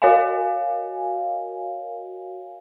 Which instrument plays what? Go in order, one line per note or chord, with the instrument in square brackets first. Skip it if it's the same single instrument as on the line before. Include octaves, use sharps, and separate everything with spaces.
[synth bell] F#4 A#4 C#5 D#5 F5 G#5